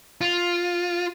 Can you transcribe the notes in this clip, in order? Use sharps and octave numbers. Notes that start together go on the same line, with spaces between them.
F4